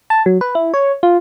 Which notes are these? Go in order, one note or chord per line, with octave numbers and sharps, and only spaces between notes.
A5
F#3
B4
E4
C#5
F4